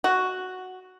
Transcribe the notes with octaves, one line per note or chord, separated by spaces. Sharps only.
F#4